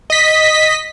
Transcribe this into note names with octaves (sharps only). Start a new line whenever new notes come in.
D#5 B6